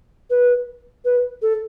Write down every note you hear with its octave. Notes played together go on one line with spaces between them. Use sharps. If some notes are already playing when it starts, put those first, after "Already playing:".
B4
B4
A4